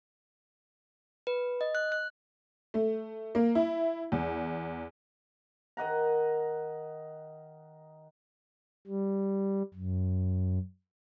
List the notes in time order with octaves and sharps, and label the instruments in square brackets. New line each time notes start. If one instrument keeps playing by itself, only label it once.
[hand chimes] B4
D#5
F#6
F#6
[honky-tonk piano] A3
A#3
E4
E2
[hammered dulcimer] D#3 D#5 F#5 A#5
[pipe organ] G3
F#2